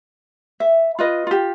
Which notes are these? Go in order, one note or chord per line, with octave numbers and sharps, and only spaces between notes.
E5
F4 B4 D#5
F4 G4